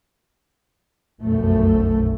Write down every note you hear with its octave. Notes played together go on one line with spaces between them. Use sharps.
F1 B1 F#2 A3